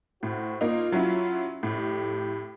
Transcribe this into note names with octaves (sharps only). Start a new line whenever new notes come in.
A2 F#4 C5
A#3 D#4 F4
F#3 C#4 E4
F2 A2 G4